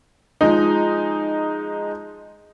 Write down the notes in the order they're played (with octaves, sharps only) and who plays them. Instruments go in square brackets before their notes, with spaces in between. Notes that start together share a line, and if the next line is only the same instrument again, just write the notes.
[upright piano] F3 G#3 D#4